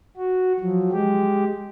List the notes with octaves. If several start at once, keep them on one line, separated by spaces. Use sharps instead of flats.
F#4
F3 F#3
G#3 G4